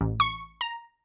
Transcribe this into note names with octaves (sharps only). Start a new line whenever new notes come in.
A1
C#6
A#5